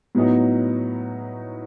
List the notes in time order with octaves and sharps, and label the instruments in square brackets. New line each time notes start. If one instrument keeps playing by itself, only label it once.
[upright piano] A2 F#3 B3 D#4 F#4